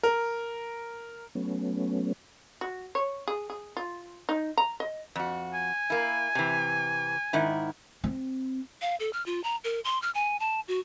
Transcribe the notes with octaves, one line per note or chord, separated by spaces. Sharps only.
A#4
F#3 A3 B3 C#4
F#4
C#5
G#4
G#4
F4
D#4
A#5
D#5
F2 F#4
G#5
A#3 E4
C3 E3
G#2 D#3 E4
C4
F5
A4
F6
F4
A#5
A#4
C6
F6
G#5
A5
F#4